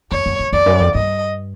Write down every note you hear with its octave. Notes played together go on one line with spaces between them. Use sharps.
F2 C#5
F#2
F2
F2 D5
F#2
F2
G2 D#5